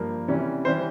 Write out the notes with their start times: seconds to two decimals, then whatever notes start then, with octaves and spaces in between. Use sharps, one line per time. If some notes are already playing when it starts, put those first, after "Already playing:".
Already playing: G2 F3 A#3
0.28 C3 E3 G3 C#4
0.65 E3 G3 C#4 C5